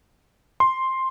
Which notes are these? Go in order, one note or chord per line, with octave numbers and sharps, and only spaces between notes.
C6